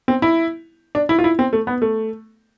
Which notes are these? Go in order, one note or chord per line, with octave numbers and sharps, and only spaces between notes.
C4
E4
D4
E4
F4
E4
C4
A3
B3
A3